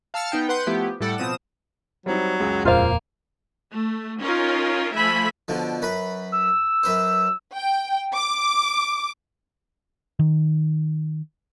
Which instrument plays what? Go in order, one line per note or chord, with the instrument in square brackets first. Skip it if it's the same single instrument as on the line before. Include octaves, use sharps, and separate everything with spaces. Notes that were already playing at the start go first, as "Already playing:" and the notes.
[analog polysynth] F5 A5 E6 F6 A6 C#7
B3 D#4 G5
B4 F#5 C6 G6
F3 A3 B3 E4 G4
A2 G3 A4 D5 F#5
B2 F3 C4 D#6 E7
[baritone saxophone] F#3 [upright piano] G3 C4 D#4
[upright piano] C#2 F#2 G#3
[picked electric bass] D#1 F2 A#2 [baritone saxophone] A#3 [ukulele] F4 C5 F5
[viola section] A3
C#4 D#4 F4 A#4
F3 A3 E5 G#5 B5
[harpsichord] B2 D3 F3
F#2 B4 B5
[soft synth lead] E6
[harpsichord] F#2 B4 C5
[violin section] G5
D6
[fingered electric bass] D#3